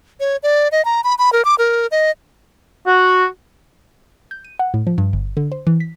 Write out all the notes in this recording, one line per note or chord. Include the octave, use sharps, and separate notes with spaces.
C#5
D5
D#5
A#5
B5
B5
A#4
D6
A#4
D#5
F#4
G6
D#7
F#5
A2
F3
G2
G1
D3
C5
E3
B6